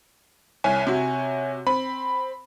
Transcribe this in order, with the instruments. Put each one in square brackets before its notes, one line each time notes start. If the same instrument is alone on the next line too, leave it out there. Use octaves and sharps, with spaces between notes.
[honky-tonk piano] C2 [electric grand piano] C#5 G#5
[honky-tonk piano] C3 F#4
[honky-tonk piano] C4 [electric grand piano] B5